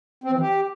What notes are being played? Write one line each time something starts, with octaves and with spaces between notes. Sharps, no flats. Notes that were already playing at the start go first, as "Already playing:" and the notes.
C4
E3
G4